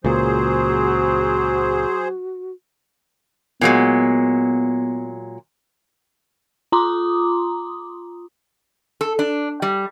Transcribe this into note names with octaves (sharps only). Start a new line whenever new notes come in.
C#2 A#2 F#3 F#4 G#4 C5
A#2 F#3 G#3 B3
F4 A#5 C6 D6 D#6
A4
D4
G3